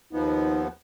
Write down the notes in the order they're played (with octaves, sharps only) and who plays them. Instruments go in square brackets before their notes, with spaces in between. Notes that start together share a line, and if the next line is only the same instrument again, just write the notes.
[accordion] D#2 F3 B3 [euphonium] D#4